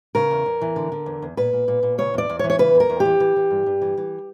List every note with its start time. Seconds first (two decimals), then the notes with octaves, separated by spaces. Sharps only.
0.15 C#3 A#4
0.31 E2
0.46 E2
0.61 E3
0.76 D3
0.92 D3
1.06 E2
1.22 E2
1.37 A#2 B4
1.53 A#2
1.68 A#2
1.83 A#2
1.98 C#3 C#5
2.14 E2 D5
2.29 E2
2.39 C#5
2.44 E3
2.50 C#5
2.59 C#3 B4
2.75 E2
2.80 A#4
2.90 E2
3.00 G4
3.05 E3
3.20 E3
3.36 E3
3.51 G2
3.66 G2
3.82 E3
3.97 E3